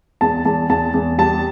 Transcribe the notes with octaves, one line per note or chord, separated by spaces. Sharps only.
E2 A5
E2 A5
E2 A5
E2
G3 A5